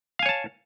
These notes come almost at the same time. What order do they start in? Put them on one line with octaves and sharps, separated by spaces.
F5 G#5 C#5 A5